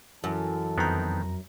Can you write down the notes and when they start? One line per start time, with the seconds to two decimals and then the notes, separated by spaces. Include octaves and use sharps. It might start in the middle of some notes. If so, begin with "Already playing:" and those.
0.24 F#2 E3 A4 A5
0.78 F2 D#3 B3 C4 A#5